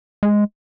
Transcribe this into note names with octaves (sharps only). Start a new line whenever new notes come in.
G#3